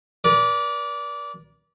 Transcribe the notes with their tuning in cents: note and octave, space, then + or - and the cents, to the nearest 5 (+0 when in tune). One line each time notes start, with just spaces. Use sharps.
A#4 +45 D5 -20